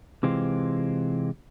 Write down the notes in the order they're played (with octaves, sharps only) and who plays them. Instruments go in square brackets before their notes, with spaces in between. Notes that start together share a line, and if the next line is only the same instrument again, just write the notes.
[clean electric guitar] C3 E3 G#3 C4 F4